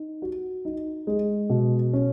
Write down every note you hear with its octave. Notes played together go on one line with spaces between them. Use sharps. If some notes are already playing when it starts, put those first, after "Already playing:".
Already playing: D#4
F#4
D#4
G#3
B2
C#4